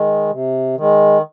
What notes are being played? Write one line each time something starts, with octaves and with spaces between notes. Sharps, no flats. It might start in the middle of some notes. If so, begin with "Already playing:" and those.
Already playing: D#3 G#3
C3
D#3 G#3